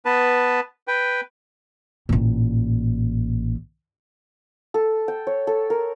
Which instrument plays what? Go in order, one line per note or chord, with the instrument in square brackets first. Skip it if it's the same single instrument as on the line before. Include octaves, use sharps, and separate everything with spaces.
[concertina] B3 B4 A5
B4 G5
[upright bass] A1 A#2
[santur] A4
G5
C#5
A4
A#4